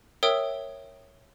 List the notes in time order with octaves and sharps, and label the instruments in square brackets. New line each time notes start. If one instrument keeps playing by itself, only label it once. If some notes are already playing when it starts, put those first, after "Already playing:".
[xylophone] A#4 C#5 E5 G5 D#6 E6